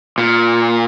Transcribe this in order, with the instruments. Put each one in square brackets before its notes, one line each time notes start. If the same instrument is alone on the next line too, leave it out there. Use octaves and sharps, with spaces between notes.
[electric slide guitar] A#2